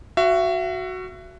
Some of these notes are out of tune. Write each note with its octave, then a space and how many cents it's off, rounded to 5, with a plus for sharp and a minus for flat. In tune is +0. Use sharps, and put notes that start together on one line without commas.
F#4 +0 E5 +35